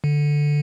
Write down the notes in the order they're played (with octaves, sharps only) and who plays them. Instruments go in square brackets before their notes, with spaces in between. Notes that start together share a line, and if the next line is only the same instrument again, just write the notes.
[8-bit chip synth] D3